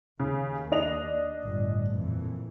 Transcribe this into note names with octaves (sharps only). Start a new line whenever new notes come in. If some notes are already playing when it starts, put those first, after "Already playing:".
D#2 C#3
D4 D#5 F7
G1 A2
F2 A#2 E3